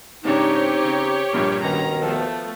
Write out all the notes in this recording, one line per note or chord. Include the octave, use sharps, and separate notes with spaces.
G#2 C#3 C4 D4 D#4 G4 C#5
C#3
A#1 G2 A#2
D#2 B2 D#3 C#4 A#5
F3 A3 B3 F4 A4